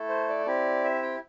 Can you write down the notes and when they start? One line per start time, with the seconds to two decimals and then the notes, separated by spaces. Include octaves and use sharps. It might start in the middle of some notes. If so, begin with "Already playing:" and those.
Already playing: A3 E4 A4
0.09 C5
0.29 D5
0.46 C4 E4 G4
0.84 E5
1.02 G5